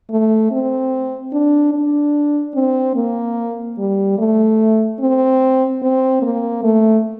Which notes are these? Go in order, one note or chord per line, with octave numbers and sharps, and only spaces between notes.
A3
C4
D4
D4
C4
A#3
G3
A3
C4
C4
A#3
A3